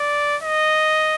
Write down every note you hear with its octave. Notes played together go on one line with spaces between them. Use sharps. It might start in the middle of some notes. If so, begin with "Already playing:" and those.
Already playing: D5
D#5